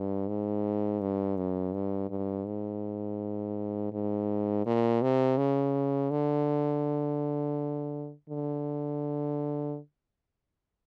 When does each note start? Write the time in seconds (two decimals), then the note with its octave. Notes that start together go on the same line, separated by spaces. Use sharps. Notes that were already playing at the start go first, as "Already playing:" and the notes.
Already playing: G2
0.28 G#2
1.01 G2
1.37 F#2
1.73 G2
2.10 G2
2.47 G#2
3.93 G#2
4.66 A#2
5.02 C3
5.38 C#3
6.11 D3
8.29 D3